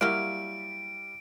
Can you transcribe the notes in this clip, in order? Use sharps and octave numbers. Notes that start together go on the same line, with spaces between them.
F#3 G3 A#3 E4 G4 F5 D7